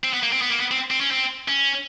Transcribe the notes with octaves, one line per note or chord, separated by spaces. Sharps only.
C4
B3
A#3
C4
B3
A#3
B3
C4
C4
C#4
C4
C#4